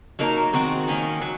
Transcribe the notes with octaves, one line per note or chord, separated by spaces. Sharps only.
F#3 A#3 D#4 A#4
D#3 G#3 C4 F#4
D#3 A#3 C#4
F#3